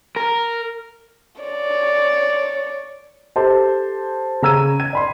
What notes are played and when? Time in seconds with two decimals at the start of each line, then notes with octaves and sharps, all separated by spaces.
0.16 A#4
1.41 C#5 D5
3.36 G4 A4 C5 A5
4.42 C#3 A#5 E6 G#6 D#7
4.80 G#6 D#7
4.93 D5 B5 C6